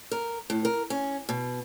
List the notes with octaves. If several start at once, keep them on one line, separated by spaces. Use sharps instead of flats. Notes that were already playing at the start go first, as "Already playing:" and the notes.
A#4
A2
A#4
C#4
B2